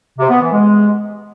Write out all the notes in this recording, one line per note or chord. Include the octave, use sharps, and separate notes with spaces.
C3
B3
E3
G#3